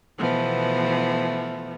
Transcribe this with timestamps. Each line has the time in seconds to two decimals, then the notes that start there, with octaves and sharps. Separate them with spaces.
0.18 B2 E3 F3 A3 B3